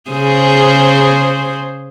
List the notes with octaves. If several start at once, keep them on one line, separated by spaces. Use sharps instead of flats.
C#3 G#4 C5